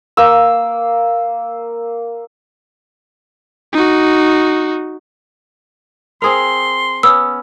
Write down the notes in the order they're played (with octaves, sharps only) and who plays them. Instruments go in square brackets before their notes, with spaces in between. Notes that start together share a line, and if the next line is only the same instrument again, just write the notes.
[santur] A#3 E6
[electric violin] D#4 F#4
[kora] C4 G#4 A#4 [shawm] C6
[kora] B3 C#4 [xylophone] E6